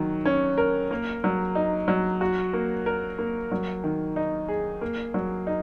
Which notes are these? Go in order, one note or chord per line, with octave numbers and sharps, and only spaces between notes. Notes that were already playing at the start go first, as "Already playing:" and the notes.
Already playing: D#3 F#3
C#4
A#4
A#3
F#3
D#4
F#3
F#4
A#3
A#4
A#3
F#3
D#3
D#4
G#4
A#3
F#3
D#4